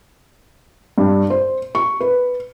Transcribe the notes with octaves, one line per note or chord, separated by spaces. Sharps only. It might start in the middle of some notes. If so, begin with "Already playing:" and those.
G2
C5
C#6
B4